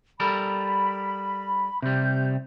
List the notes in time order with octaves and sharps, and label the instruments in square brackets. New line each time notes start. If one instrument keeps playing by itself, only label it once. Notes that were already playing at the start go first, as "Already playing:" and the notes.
[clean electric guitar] G3 A4 A#4 [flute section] B5
[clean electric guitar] C3 G3 [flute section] G6